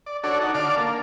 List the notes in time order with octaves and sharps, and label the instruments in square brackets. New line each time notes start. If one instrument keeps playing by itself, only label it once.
[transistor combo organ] D5
D4 F#4 A4 C#5 D5
D#4 F#5
D3 D5 F5 A5 D6
A#3